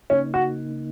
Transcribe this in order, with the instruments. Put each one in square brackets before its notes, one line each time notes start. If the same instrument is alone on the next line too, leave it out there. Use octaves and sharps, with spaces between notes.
[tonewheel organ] C#3 A#3 D#4 [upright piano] C#4
[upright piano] F#4